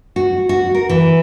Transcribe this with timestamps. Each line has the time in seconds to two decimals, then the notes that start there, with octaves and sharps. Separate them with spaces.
0.16 F#4
0.49 F#4
0.74 A#4
0.89 E3